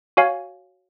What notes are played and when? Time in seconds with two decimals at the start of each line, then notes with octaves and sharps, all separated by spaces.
0.17 F#4 C#5 F5 G#5